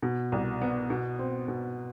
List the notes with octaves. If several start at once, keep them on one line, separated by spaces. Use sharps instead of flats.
B2
C2
B3
B2
C4
B2